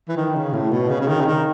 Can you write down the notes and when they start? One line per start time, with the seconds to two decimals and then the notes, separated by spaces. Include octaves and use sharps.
0.08 E3
0.17 D#3
0.36 C#3
0.53 A2
0.71 B2
0.89 C#3
1.01 C#3
1.08 D#3
1.21 C#3
1.25 D#3